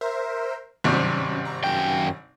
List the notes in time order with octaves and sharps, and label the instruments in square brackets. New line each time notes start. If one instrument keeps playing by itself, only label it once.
[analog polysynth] A#4 C5 E5
[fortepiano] G#1 G2 C3 [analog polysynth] F#3 C#4
[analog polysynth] A#5
[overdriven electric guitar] F#2 G5 [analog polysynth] D#3 G#5 A#6